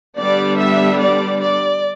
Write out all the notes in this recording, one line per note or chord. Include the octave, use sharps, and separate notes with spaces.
D3 G3 B3 D4 D5
E5
D5
D5